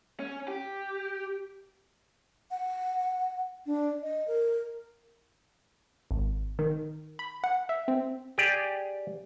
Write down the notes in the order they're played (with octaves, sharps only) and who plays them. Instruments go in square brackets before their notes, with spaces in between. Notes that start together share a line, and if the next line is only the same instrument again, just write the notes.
[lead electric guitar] C#4
G4
[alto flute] F#5
D4
D#5
A#4
[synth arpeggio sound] G#1
D#3
B5
F#5
E5
C4
[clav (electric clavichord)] G4 G#4 D5